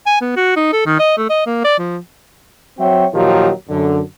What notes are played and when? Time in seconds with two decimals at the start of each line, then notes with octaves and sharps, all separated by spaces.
0.06 G#5
0.21 B3
0.36 F#4
0.56 D#4
0.73 A4
0.86 D#3
0.99 D#5
1.17 A3
1.30 D#5
1.46 A#3
1.64 D5
1.79 F3
2.79 F#3 C4 F#4 C#5 E5 G5
3.13 A#2 D#3 F3 F#3 F4 G4
3.69 F#2 D3